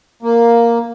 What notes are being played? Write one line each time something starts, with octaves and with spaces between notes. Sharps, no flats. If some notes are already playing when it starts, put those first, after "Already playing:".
A#3